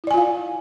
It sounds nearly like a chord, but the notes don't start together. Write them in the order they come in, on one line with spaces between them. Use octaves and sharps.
E4 D5 G#5 F4 F5